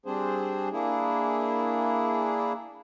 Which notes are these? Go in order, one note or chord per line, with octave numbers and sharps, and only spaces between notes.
G3 C4 D4 G#4 C5
A#3 D4 E4 G#4